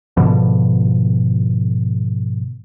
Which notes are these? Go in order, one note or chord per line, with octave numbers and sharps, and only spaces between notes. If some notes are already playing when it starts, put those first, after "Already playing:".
G#2 B2 D3 F3